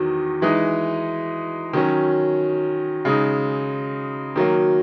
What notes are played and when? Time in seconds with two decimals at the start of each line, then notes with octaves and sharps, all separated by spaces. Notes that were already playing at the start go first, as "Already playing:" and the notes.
Already playing: E2 D#3 F#3
0.42 E3 G#3 D#4
1.73 D#3 F#3 C#4
3.05 C#3 G#3 D#4
4.36 D#3 F#3 A#3